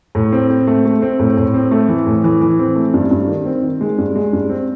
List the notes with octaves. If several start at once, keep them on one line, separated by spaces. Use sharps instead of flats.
A2
C4
C4
A3
A3
C4
A2
A2
C4
A3
E3
A2
E3
E3
C4
A3
G2
G2
D#3
C4
D#3
G#3
G2
G#3
G2
C4